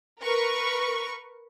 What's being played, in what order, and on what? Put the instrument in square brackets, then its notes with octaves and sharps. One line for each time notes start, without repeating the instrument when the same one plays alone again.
[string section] A#4 B4 C#6